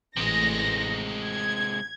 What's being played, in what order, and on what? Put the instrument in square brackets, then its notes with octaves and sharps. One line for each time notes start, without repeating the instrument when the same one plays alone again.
[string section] A1 A#6 [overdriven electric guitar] C3 G#3
[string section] G#6